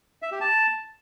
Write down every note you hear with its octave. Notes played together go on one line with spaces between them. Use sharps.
E5
G4
A5